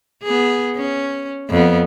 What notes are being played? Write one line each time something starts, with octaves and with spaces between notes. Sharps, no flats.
B3 G#4
C#4
F2 B3